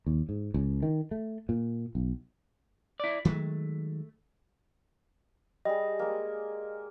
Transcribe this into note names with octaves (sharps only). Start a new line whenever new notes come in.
D#2
G#2
C#2
D#3
A3
A#2
B1
E4 D5
D#3 F#3 G#3 A3
G3 G#4 D#5
G#3 A#3